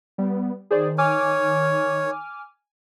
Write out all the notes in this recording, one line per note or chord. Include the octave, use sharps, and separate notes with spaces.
G3 B3
D#3 G#4 C5 D5
C#5 G#5 D6 F6